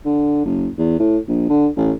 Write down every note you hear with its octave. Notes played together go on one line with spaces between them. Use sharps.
D3
F#1
E2
A2
A#1
D3
A1